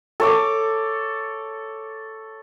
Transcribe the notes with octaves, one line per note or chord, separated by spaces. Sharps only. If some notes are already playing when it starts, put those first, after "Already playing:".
A4 C#5 D6